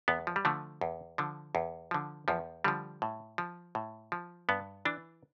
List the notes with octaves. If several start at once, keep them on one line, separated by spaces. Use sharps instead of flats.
E2 B3
F3
G3
D3 F3 A3
E2
D3 F3
E2
D3 F3
E2 F3
D3 F3 G3
A2
F3
A2
F3
G2 B3
E3 D4